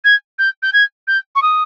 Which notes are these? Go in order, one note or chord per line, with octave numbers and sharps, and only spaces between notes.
G#6
G6
G6
G#6
G6
C#6
D#6